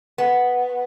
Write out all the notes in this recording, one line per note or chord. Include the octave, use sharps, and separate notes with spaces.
B3